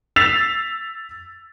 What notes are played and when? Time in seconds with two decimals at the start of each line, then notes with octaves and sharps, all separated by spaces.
0.16 E6 A6 B6 C7 F7